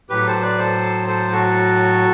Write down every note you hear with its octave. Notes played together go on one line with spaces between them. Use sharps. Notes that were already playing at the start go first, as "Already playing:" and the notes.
A2 F#3 G4 B4
A4 C5
B4 D5
A4 C5
A4 C5
F#4 A4